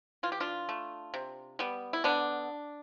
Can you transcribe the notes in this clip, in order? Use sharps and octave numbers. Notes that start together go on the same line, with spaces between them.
E3 F4
G4
D4 F4
A3
C3
G3 B3
E4
D3 B3 D4